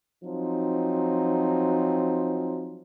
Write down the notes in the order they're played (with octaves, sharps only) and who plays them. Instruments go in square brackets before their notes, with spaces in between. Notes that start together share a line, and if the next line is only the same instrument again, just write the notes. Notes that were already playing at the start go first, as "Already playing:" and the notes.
[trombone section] F3 F#3 C4 D#4